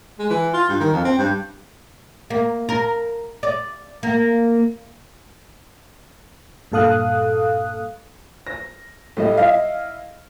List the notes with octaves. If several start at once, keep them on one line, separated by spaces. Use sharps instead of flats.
G#3
E3
F4
G2
D#3
F2
C4
G2
A#3
A#4
D5
A#3
G2 A#2 A4 F5 D#6 F#6
A#6
A2 G3 D#5
E4 D#5 F5